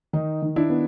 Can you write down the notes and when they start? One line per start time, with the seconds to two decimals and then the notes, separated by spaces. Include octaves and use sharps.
0.13 D#3 D#4
0.42 D#3
0.56 D4 E4
0.70 B3